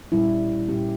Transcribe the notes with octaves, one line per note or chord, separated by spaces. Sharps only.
A#2 G3 C#4 E4
A#2 G3 C#4 G4